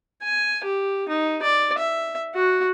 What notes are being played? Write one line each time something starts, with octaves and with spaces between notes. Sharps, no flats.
G#5
G4
D#4
D5
E5
F#4